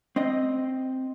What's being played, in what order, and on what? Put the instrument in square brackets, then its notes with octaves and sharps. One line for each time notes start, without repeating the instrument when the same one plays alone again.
[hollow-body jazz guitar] C4 D#5